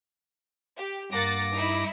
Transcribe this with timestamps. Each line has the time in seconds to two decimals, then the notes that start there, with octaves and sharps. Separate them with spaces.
0.77 G4
1.12 G2 A#3 F#5 D6 A6 A#6
1.54 D#4 E4